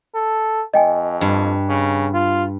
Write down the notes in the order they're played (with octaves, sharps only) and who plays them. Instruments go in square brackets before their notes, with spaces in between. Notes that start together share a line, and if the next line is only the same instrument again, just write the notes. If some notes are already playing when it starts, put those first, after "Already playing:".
[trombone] A4
[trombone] F2 [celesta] D#5 G5 G#5
[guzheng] G2
[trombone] C#3
F4